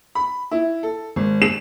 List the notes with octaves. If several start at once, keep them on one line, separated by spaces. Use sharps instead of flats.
B5
E4
A4
G#1
E7